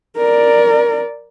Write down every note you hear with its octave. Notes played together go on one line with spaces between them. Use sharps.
A#4 D5